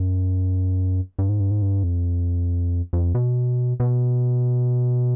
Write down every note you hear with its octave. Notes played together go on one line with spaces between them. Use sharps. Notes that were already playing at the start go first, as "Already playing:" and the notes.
Already playing: F#2
G2
G#2
G2
G#2
G2
F2
F2
B2
B2